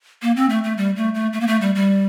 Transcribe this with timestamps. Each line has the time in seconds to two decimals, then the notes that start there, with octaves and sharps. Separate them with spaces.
0.22 A#3
0.36 C4
0.49 A3
0.64 A3
0.78 G3
0.96 A3
1.14 A3
1.33 A3
1.40 A#3
1.47 A3
1.61 G3
1.75 G3